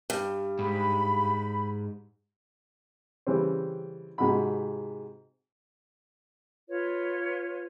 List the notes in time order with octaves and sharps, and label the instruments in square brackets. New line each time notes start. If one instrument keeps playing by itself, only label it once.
[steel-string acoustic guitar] G2
[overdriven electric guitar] G#2 [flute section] B5
[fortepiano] C#3 E3 G3 C4
G#2 C3 F#4 B5
[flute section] F4 B4 C#5